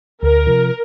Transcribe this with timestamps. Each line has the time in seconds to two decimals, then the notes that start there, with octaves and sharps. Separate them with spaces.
0.23 D2 A#4
0.46 C3 F3